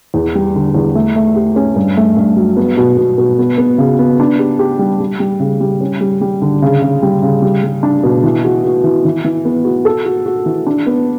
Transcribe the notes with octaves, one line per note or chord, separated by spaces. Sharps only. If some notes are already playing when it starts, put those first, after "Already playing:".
E2
G3
D3
E2
A3
A3
G4
C#4
G2
A3
G2
F#3
B3
B2
B2
B2
B3
B3
C#3
B3
D4
G4
G4
G3
G3
G3
C#3
G3
C#4
G3
G3
D3
C#3
C#3
G3
C#3
G3
G3
D4
B2
E3
F#4
F#4
E3
E3
E3
B3
F#4
A4
F#4
F#4
E3
D4
B3